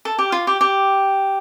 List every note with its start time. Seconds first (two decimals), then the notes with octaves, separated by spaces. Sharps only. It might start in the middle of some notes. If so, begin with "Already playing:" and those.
0.05 A4
0.19 G4
0.32 F4
0.47 G4
0.61 G4